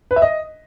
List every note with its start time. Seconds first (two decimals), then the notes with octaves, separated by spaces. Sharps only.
0.11 B4
0.16 E5
0.22 D#5